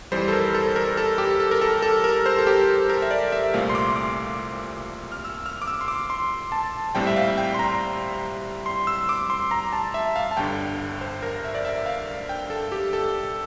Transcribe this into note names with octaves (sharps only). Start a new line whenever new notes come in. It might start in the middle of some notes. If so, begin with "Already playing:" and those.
F2 E3 G3 C5
A4
A#4
A4
A#4
A4
G4
A4
A#4
A4
A4
A#4
C5
A4
G4
A#4
E5
D5
E5
C2 A#2 A3 C4 F5
C6
D6
C6
D6
F6
E6
F6
D6
E6
C6
D6
C6
A5
A#1 A2 G3 C4 G5
E5
F5
G5
C6
A#5
C6
E6
D6
C6
A#5
A5
E5
F5
A5
G1 G2 D3 G5
C5
A#4
E5
D5
E5
F5
G5
A4
G4
A4